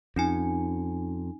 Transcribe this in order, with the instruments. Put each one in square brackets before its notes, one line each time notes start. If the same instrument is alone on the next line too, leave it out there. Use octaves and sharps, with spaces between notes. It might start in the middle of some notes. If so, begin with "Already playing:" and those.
[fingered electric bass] F2 [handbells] C#4 D#4 G#5